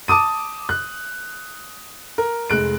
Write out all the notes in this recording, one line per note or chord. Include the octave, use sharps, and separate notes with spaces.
A5 D6 D#6 D#7
F#6
A#4
F1 G#3 F#6 D7